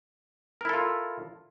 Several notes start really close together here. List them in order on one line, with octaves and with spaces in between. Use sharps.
A#4 E4 A4 F4